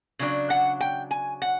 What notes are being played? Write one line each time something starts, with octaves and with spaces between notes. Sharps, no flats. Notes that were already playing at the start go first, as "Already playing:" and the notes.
C#3 F#3 D4
F#5
G5
G#5
F#5